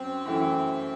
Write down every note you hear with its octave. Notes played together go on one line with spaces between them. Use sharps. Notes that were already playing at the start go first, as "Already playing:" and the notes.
Already playing: F#2 C4
F#2 E3 A3 E4